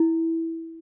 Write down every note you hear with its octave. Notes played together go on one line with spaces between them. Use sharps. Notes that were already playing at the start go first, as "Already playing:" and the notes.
Already playing: E4